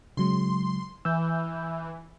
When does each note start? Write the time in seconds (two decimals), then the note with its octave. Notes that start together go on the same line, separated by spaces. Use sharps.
0.17 C#3 F#3 G#3 C6
1.05 E3 E6 G6